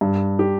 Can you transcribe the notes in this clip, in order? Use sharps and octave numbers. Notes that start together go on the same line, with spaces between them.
G2
G4